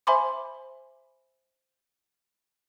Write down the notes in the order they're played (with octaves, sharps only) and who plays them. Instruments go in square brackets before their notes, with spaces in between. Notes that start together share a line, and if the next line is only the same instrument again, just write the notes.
[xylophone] C5 E5 G#5 B5 C6 D6